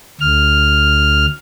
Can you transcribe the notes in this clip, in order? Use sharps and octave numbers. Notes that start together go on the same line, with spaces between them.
D2 F6